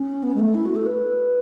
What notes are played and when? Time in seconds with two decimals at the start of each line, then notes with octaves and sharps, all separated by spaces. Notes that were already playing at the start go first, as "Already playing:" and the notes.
Already playing: C#4
0.23 B3
0.35 G#3
0.39 A3
0.54 E4
0.65 F#4
0.76 A4
0.86 B4